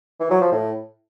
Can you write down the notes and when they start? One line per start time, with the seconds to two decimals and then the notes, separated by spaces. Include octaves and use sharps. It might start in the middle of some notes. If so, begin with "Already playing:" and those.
0.20 E3
0.31 F#3
0.41 F3
0.52 A2